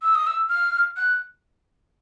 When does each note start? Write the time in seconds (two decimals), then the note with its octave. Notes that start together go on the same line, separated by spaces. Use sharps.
0.02 E6
0.15 D#6
0.26 E6
0.49 F6
0.96 F#6